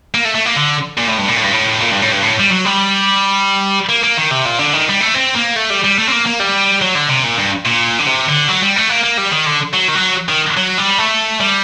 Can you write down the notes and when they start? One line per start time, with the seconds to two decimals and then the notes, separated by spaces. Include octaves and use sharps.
0.14 A#3
0.25 A3
0.35 A3
0.46 A#3
0.56 D3
0.98 A#2
1.08 A2
1.18 G2
1.29 A#2
1.37 A2
1.44 G2
1.53 A2
1.81 A#2
1.92 G2
2.02 A2
2.12 G2
2.23 A2
2.39 G3
2.50 F#3
2.65 G3
3.89 A#3
4.04 A#3
4.17 D#3
4.31 C3
4.45 A#2
4.59 D3
4.73 D#3
4.89 G3
5.01 A3
5.15 C4
5.36 A#3
5.56 A3
5.70 G3
5.84 G3
5.98 A3
6.07 C4
6.12 A#3
6.26 A#3
6.40 G3
6.82 F#3
6.95 D3
7.09 C3
7.24 A#2
7.37 G2
7.65 A#2
7.99 D3
8.06 C3
8.28 D3
8.48 F#3
8.62 G3
8.76 A3
8.89 A#3
9.03 A#3
9.17 G3
9.31 D#3
9.46 D3
9.73 F#3
9.88 D#3
9.95 F#3
10.28 D#3
10.57 F#3
10.78 G3
10.98 A3
11.40 G3